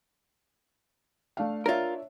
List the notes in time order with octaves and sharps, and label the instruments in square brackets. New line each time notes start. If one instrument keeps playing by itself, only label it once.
[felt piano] A3 D4 F5
[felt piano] D4 C#5 E5 [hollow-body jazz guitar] F4 A#4